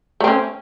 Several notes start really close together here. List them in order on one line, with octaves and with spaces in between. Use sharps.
A3 C4 C#4